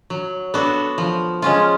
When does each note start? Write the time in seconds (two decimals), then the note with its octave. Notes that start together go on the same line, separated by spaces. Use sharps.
0.10 F#3
0.54 B3 D4 F#4 A4
0.98 F3
1.42 G#3 C#4 F4